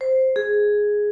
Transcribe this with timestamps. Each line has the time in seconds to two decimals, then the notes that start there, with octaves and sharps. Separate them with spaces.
0.01 C5
0.36 G#4